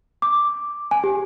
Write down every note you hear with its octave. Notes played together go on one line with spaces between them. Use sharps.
D6
G#5
G4